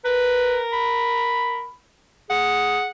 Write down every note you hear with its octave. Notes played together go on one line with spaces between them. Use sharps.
A#4 B4
B5
G#4 F#5